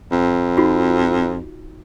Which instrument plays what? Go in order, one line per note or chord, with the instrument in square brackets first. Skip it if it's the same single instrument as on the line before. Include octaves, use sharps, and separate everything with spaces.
[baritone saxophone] F2
[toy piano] D#4 F4 F#4